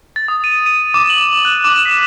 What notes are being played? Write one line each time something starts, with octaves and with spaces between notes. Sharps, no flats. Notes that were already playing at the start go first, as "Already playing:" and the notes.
A6
D#6
D#7
D#7
D6
F#7
F#6
D6
B6